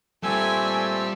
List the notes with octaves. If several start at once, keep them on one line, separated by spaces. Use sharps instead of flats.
A#2 G3 A3 C4 G#5 E6